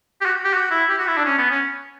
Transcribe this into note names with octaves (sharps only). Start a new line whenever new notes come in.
G4
F#4
G4
F#4
E4
G4
F#4
E4
D4
C#4
B3
C#4